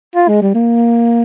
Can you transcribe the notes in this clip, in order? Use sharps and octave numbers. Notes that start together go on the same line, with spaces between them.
F4
G#3
G3
A#3